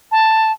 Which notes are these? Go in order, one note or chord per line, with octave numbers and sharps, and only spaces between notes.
A5